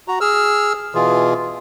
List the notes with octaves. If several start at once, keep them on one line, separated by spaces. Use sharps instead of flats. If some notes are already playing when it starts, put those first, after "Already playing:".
F#4 A#5
G#4 E6 F6
B2 E3 F4 G#4